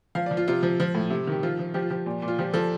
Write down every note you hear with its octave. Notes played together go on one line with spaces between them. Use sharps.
F3 F5
D5
F3
F4
C3 F4
F3
F3
A2
C3
D#3 G4
F3 F4
F3
F3 G4
F4
F3 G4
A#2
A#2
F4
F3 G4
F3 A4